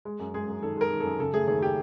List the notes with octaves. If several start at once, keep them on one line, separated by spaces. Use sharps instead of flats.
G#3
F#2
G#3 G#4
F#2
D#3 A4
G#3 A#4
D#3
F#2 A4
C#3 A4
A3 G#4
D#2 G#4
G4